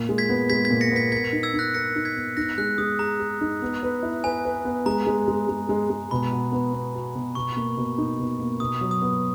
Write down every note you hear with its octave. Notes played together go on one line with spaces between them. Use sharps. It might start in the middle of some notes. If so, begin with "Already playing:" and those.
Already playing: A#2
G#3
G#6 B6
B3
G#3 G#6 B6
G#6 B6
A#2
A#6 C#7
B3
G#6 B6
A#4 G#6 B6
D#4
E6 G#6
D#4
F#6 A#6
A#4 A#6 C#7
D#4
G#6 B6
B3
D#4 F#6 A#6
G#3 F#6
G#3 D#6
G#4 A#5
G#4
D#4
B3
B4
E4
B4 G#5
B4
B3
G#3 A#5
G#3
G#3
G#3
G#3
G#3
B2 B5
F#4
B3
B3
F#4
B2
B2 C#6
A#3
B2
D#4
B2
A#3
B2 D#6
F#3
D#6
B3